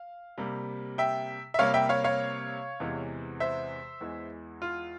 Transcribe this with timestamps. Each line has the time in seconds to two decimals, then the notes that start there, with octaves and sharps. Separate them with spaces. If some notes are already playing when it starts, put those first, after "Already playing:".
Already playing: F5
0.38 C3 G3 A#3
0.98 E5 G5
1.54 E5
1.59 C3 G3 A#3 C#5 F5
1.74 E5 G5
1.89 C#5 F5
2.04 C#5 F5
2.80 E2 C3 E3 G#3
3.40 C5 E5
4.01 E2 E3 G#3
4.62 F4